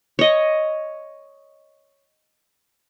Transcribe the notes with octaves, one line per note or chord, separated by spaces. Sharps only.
C#5 D#5